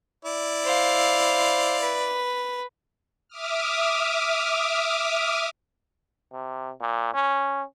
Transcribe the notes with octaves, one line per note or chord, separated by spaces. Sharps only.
E4 D5
C5 F5
B4
E5 D6 D#6 F6
C3
A#2
C#4